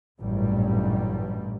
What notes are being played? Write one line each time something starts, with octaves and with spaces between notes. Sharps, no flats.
A1 G2 A#2 F#3 G3